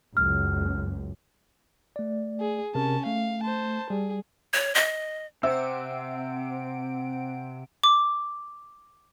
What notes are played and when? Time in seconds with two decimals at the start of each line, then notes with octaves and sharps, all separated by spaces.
0.17 F#1 C#2 F#2 F6
1.96 A3 D5
2.40 G#4
2.75 C3 C#4 A#4 A5
3.06 A3 F5
3.43 C5 A5
3.90 G3 G#4
4.54 C#5
4.75 D#5
5.43 C3 C4 C5 E5 F#5 E6 D7
7.84 D6